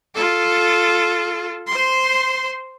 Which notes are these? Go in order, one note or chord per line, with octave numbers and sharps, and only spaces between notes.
F4 A4
C5 C6